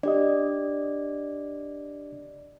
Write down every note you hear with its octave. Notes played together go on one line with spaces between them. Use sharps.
D4 G4 D5 D#5